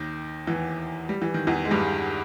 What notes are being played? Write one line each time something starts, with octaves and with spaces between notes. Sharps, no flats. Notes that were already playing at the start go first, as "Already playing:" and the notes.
Already playing: D#2 D#3
E2 E3
G3
E3
D#3
E2 E3
G#3
G2 G3